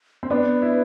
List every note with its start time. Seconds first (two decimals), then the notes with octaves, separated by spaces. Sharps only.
0.23 C4
0.30 B3 D4 B4
0.62 E4